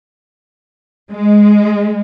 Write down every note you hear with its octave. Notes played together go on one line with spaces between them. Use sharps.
G#3